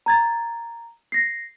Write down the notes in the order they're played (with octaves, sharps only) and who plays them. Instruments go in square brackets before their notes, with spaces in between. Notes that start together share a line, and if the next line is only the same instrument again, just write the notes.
[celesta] A#5 G#6 A6
A#6 C7